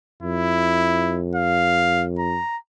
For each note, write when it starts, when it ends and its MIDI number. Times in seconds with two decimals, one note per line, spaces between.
0.23 2.40 41
0.23 1.21 64
1.35 2.06 77
2.19 2.57 82